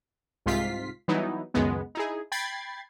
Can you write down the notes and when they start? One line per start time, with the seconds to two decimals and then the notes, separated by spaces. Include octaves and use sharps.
0.46 C2 G#2 C3 F4 B6 C7
1.08 E3 F#3 G3 B3 D#4 E4
1.54 C#2 F#2 D#3 G#3 B3
1.95 D#4 E4 G#4
2.32 G5 B5 G#6 A6 C7